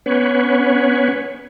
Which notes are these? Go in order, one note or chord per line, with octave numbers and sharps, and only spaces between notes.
B3 C#4 B4 C#5